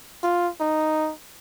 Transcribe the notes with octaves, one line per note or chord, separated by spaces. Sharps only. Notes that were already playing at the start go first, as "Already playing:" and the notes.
F4
D#4